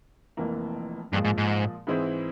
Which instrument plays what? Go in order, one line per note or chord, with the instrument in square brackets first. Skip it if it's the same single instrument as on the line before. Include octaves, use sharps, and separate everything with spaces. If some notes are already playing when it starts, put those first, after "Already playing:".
[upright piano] F1 F2 E3 A#3
[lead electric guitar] G2 [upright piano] A#2 F3 G#3
[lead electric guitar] G#2
G#2
[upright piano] G#2 E3 G#3 C4 E4